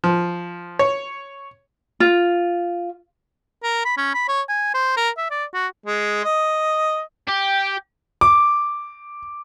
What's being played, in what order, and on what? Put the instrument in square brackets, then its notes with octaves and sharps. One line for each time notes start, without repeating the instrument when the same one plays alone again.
[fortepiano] F3
C#5
[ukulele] F4
[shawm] A#4
B5
C#4
B5
C#5
G#5
C5
A#4
E5
D5
F#4
[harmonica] G#3
D#5
[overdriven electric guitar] G4 [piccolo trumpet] G5
[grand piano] D6